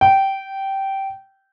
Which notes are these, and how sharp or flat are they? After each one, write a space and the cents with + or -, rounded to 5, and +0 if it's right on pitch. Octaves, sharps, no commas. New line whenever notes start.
G5 -15